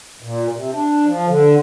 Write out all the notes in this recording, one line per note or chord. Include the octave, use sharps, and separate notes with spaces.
A#2
C3
D4
F3
D3